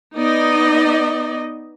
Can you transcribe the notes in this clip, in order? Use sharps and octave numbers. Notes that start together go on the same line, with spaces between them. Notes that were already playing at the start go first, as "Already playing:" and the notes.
B3 D#4 D5 D#5